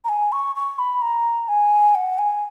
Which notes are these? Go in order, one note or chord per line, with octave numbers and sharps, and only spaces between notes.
A#5
G#5
C#6
C#6
B5
A#5
G#5
F#5
G#5